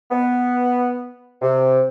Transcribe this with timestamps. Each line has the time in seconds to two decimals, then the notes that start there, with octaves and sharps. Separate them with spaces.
0.11 B3
1.41 C3